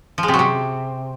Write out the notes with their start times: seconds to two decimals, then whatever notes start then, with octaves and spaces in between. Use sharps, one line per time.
0.18 F3
0.23 G#3
0.28 C3
0.34 F#3
0.39 C3